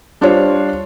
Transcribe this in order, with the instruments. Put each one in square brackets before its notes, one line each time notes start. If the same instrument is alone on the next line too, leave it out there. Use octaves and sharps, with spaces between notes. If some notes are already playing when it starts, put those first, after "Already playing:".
[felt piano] G3 D4 F4 C5 C#5